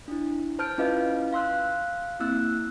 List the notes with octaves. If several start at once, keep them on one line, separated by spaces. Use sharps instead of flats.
D4 E4
C5 A5 F6 G6 D7
C#4 E4 F4 B4 D#5 F5
F5 C6 E6 F#6
A#3 C4 E4 E6 F#6